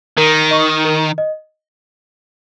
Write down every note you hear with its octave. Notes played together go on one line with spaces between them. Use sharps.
D#3 A#4
D#5 C#6
A#4
D#5